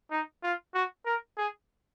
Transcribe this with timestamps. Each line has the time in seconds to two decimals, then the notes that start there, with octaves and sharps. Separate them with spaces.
0.11 D#4
0.43 F4
0.74 F#4
1.06 A#4
1.37 G#4